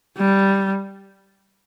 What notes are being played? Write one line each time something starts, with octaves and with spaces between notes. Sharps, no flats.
G3